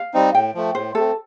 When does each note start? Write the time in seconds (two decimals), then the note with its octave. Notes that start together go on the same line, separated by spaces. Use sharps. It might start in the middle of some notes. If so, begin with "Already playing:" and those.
Already playing: F5
0.14 G3 C4 D#4
0.35 A2 G5
0.55 F3 A3
0.75 A2 C5
0.94 A3 C4 A4